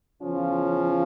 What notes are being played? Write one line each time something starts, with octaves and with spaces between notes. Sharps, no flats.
E2 C#3 F3 C#4 F4